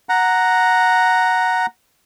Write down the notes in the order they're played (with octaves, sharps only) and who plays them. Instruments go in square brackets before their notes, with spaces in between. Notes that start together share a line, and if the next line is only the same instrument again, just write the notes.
[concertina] F#5 A#5